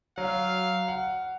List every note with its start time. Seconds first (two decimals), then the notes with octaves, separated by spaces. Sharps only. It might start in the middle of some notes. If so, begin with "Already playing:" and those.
0.18 F#3 F5
0.88 F#5